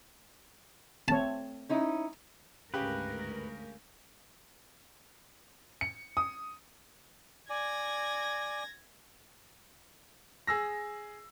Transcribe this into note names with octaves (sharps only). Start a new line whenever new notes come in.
A3 C4 C#5 A5
C#4 D#4 E4
D2 G#2 C#3 G4 A#4 B4
C#7
D#6
D5 G#5 G#6 A#6
G#4 E6 A#6